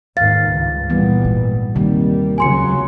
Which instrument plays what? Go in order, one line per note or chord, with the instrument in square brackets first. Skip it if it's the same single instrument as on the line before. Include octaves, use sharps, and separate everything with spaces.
[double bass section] D#2 G#2 D#3 [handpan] F5 [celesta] A6
[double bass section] C#2 G2
[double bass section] A#2 G3 [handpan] E3 B3
[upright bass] G#2
[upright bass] D#2 [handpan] C3 D#3 [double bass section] G3
[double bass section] C#2 C#3 F#3 [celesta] G#5 C6 C#7